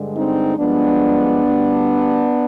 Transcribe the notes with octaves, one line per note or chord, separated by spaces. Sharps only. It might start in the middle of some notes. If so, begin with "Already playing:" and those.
Already playing: G2 D3 G#3
C4 D#4
G2 F3 G#3 B3 D4
D2 D3 G3